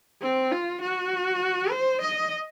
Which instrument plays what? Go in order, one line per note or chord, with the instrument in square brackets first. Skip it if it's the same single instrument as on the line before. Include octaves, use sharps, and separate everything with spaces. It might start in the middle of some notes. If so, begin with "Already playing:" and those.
[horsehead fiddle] C4
F4
F#4
C5
D#5